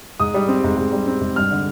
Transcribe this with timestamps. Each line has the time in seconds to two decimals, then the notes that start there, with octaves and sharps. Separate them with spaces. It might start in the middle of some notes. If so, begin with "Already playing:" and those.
0.20 G#2 D#6
0.34 G3
0.48 C4
0.64 G#2
0.77 G#2
0.92 G3
1.07 C4
1.21 G#2
1.36 G2 F6
1.51 D3